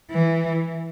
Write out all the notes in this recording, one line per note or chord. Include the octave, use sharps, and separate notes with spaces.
E3